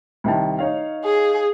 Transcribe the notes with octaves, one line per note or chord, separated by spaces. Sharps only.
C2 D#3 A5
D#4 C#5 F5
G#4